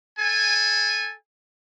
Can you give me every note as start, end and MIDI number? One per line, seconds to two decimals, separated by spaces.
0.18 1.14 69
0.18 1.14 80